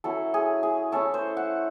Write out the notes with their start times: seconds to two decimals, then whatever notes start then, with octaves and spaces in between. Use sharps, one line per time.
0.04 F#3 C#4 E4 A4
0.34 G#4
0.63 G#4
0.92 A3 C#4 E4 A4
1.14 C5
1.37 F#5